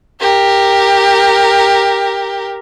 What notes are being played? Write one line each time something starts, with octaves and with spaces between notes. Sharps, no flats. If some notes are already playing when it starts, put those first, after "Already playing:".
G4 A#4